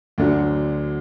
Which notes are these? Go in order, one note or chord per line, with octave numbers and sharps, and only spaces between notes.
D2 D3 F#3